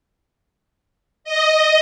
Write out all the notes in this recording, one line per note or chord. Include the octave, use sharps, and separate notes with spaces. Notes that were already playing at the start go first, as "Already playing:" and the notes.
D#5